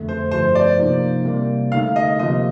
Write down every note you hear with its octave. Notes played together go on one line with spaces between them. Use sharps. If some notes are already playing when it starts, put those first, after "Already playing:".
Already playing: F2 D3 A3
C5
G2 F3 A3 C5
D5
C3 F3 A#3 D#4
C3 G3 A#3
D3 A3 D#4 F5
D#5
C3 F3 A#3 D#5